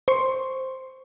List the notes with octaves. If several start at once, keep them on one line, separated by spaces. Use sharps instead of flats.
C5 C6 C#6